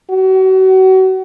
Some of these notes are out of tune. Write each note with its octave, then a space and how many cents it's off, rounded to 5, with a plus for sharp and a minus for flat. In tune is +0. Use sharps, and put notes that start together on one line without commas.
F#4 +35